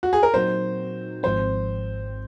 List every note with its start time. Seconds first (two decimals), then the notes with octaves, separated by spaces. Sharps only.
0.03 F#4
0.13 G#4
0.23 A#4
0.33 A#2 F#3 C4 D#4 F#4 C5
1.23 G#1 G#2 F3 C4 C5